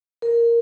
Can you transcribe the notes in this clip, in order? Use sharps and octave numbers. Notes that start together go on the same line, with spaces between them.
A#4